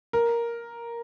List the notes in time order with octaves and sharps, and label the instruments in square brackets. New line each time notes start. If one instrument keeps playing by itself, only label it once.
[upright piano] A#4